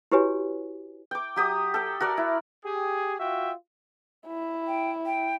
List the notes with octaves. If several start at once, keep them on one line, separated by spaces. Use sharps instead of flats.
E4 F#4 G4 B4 C#5 G#5
G5 D6
F#3 G4 D#6
A4 G5
F#4 A#4 D5 F#5
E4
G4 G#4
F4 F#4 E5 G5
E4
G5
G5